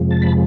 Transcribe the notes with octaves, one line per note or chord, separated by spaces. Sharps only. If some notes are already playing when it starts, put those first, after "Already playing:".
Already playing: F2 C3 F3 G#3
A5
B5